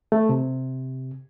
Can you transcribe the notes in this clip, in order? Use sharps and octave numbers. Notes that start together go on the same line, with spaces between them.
A3
C3